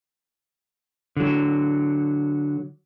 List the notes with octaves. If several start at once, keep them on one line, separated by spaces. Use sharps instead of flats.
D3 F#3